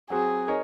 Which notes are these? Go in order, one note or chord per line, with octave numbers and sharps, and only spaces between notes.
F#3 C4 F#4 G#4
D#4 A#4 C#5